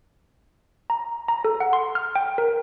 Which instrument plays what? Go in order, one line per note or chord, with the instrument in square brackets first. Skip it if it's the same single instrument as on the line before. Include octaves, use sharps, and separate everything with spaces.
[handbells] A#5
A#5
A4
F#5
C6
F6
G5
A#4